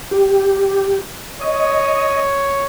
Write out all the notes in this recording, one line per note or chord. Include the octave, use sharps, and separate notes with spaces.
G4
C#5 D#5